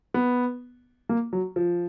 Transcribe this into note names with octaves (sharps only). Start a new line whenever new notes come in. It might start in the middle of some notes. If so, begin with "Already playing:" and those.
B3
A#3
F#3
F3